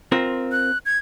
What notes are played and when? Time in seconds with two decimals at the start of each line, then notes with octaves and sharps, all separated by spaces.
0.12 C4 F4 A#4
0.52 F#6
0.86 G#6